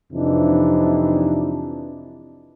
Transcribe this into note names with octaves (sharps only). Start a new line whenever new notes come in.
F2 C3 E3 D4 D#4